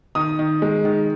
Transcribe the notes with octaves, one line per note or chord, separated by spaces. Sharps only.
D#3 D#6
D#3
G#3
D#3